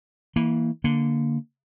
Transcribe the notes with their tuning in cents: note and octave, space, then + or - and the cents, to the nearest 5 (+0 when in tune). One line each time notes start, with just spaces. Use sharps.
E3 -20 A#3 +0
D3 +0 A#3 +0